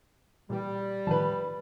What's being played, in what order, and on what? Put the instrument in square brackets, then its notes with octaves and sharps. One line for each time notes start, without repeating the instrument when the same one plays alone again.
[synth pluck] A#2 E3 G4 [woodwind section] G3
[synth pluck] A2 D#3 F3 [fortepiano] B4 A5